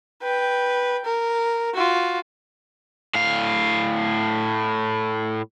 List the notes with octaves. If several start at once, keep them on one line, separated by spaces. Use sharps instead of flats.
B4 G5
A#4
F4 F#4
A2 F5